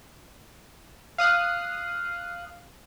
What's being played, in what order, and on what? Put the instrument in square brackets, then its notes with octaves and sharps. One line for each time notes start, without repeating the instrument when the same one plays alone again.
[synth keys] F5 D#6 F#6